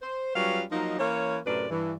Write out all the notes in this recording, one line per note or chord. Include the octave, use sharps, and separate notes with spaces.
C5
F#3 G3 C#4 F4 B4 F5
F3 F#3 A#3 D#4
E3 A#3 C#4 C#5
F#2 A2 C3 A#4 B4 D5
G2 E3